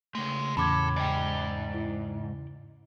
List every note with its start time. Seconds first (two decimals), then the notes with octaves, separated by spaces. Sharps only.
0.15 C2 C#3 G#3 A3
0.57 E2 A2 C#3 A4 B5 D6 G#6
0.96 G#2 D5 G5
1.74 E4